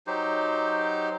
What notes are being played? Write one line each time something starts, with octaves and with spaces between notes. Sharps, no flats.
F#3 D#4 G4 C5